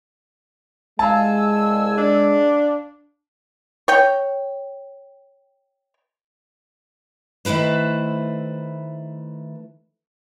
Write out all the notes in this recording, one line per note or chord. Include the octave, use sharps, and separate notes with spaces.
C2 G#3 F5 G#5 A5 E6
D4
C#5 G5
D#3 A3 E4 B4 C5